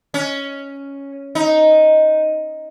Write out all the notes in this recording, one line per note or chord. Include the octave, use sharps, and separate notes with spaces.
C#4
D#4